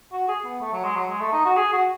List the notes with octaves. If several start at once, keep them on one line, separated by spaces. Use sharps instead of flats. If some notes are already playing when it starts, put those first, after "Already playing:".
F#4
G#4
B3
A3
F#3
G#3
F#3
G#3
A3
D#4
F#4
G#4
F#4